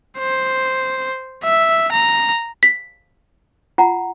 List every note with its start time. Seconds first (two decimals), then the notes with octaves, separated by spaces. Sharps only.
0.19 C5
1.44 E5
1.92 A#5
2.63 B6
3.78 F4 F#5 A#5